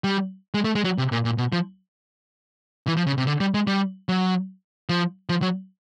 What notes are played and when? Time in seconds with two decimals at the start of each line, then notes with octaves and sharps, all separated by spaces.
0.04 G3
0.54 G#3
0.64 A3
0.75 G#3
0.84 F#3
0.98 C3
1.12 A#2
1.25 A#2
1.38 B2
1.53 F3
2.87 E3
2.97 F3
3.07 C#3
3.18 C3
3.27 D3
3.40 G3
3.54 G#3
3.67 G3
4.09 F#3
4.89 F3
5.29 F3
5.42 F#3